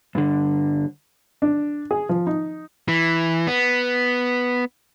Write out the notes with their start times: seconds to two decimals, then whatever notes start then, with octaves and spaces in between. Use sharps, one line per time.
0.15 G2 D3
1.42 D4
1.91 G#4
2.09 F3
2.27 D#4
2.88 E3
3.47 B3